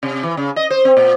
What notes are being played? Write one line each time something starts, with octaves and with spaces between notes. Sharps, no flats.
C3
E3
C#3
D#5
C5
C4
A#2